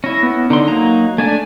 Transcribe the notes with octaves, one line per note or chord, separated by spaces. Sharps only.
C#4 E4 A#6
B3
D3 D#4 C6
F#3 A#3 A#5
A3 D4 D5 G#5